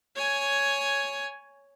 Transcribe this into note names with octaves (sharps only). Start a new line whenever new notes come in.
C#5 G#5